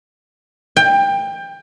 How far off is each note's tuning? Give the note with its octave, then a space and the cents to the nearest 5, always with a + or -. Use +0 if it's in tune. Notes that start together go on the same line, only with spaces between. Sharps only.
G5 +20